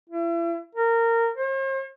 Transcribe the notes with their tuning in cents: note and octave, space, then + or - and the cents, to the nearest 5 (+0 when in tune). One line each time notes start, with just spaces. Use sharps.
E4 +40
A#4 -20
C5 +45